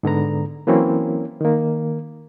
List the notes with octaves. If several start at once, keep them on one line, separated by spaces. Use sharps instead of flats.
G#2 D3 B3 A#5
E3 F#3 A#3 C4 C#4 E4
D#3 A#3